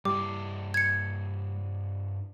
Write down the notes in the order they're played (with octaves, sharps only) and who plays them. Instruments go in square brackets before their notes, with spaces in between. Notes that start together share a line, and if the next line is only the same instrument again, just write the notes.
[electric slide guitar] G2 E4 [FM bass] G3 [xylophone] D6
[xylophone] G#6 C#7